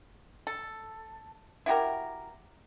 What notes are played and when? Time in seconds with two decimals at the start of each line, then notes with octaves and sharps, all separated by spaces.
0.47 A4
1.66 E4 F#4 G4 A#4